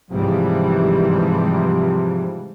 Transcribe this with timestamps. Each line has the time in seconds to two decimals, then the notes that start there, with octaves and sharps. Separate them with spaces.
0.11 G#2 C3 E3 F3 G3